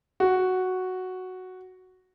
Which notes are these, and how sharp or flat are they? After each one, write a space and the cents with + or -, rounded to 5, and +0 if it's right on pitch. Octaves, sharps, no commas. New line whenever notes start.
F#4 +0